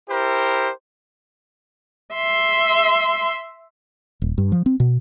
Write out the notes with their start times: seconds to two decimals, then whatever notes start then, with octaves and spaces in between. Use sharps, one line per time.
0.10 E4 G4 A#4 C5
2.14 E5 C6
4.22 D#1
4.38 G2
4.52 F3
4.66 C4
4.80 B2